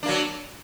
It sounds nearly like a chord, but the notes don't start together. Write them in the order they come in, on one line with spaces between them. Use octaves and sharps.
D4 A#3 F#3